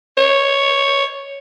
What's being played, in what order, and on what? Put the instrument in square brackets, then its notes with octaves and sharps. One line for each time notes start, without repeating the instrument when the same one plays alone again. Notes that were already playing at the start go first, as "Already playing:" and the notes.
[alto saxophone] C#5